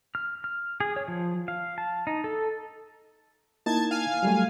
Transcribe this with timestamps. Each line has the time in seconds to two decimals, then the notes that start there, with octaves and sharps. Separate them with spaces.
0.15 F6
0.44 F6
0.80 G#4
0.96 C#5
1.08 F3
1.48 F5
1.78 A5
2.07 D#4
2.24 A4
3.66 A#3 D#4 E4 A5 G#6
3.91 F5 G#5
4.23 F#3 G3 A3